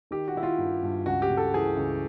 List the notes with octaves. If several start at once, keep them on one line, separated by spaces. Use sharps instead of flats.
D#3 G4
F#4
D#3 E4
F4
G2
G2
C#2 F#4
G4
C#3
A4
E3 G#4
C#2